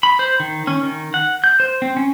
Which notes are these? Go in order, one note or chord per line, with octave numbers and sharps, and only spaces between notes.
B5
C5
D#3
C#4
D#3
F#5
G6
C5
C4
C#4